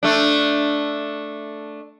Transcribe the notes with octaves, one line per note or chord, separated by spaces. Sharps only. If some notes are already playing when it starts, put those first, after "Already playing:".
A3 D4